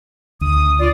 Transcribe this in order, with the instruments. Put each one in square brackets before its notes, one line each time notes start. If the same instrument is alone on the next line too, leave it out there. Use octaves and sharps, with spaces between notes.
[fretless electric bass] D2 [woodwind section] D#6
[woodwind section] F4 D5